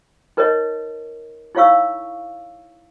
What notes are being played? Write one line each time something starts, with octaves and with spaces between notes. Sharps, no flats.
D#4 A#4 B4 C#5 D#5
D#4 E4 C#5 F5 C#6 E6